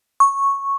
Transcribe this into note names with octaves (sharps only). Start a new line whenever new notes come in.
C#6